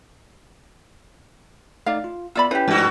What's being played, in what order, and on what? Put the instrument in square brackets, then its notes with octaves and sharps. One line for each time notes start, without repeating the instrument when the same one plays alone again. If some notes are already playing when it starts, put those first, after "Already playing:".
[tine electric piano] A3 D#4 D5 [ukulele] F5
[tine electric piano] F4
[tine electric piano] B3 E5 E6 [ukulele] F4 D5 B5
[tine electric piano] C#4 E4 [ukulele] G4 B4
[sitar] G2 F#4 [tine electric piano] F3 A3 D4